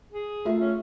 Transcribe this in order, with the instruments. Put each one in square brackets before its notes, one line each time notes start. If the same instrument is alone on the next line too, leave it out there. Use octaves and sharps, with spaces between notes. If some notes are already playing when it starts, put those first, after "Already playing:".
[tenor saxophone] G#4
[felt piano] A3 F4 E5
[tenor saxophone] C#4